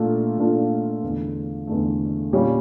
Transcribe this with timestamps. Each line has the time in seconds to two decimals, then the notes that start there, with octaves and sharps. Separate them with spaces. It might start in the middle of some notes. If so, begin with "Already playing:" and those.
Already playing: A#2 A3 D4 F4 A4
0.38 A#2 A3 D4 F4 A4
1.03 E2 D3 A3
1.67 E2 D3 A3
2.33 A#2 G3 C#4 G4